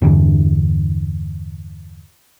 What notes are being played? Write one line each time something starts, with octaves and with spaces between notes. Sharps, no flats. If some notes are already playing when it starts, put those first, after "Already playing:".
E2 G2 D3 E3